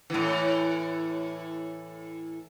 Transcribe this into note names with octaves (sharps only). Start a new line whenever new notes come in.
A2 E3